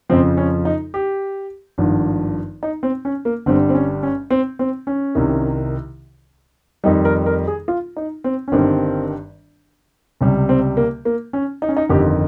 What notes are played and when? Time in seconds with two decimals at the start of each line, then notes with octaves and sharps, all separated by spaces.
0.09 F2 C#3 F3 C4
0.37 C#4
0.65 D#4
0.94 G4
1.78 G#1 G2 F3
2.63 D#4
2.83 C4
3.05 C#4
3.25 A#3
3.46 G1 G2 G3 C4
3.69 C4
3.75 C#4
4.03 C#4
4.30 C4
4.59 C4
4.87 C#4
5.15 C2 C3 D#3
6.84 F2 D#3 G3 D#4
7.05 A#4
7.26 A#4
7.47 G#4
7.68 F4
7.97 D#4
8.24 C4
8.48 C#4
8.52 G1 G2 D#3 G3 C4
10.21 C#2 C3 G3 C#4
10.49 C4
10.77 A#3
11.05 A#3
11.33 C#4
11.62 D#4
11.69 C#4
11.77 D#4
11.89 G1 F2 D#3 G4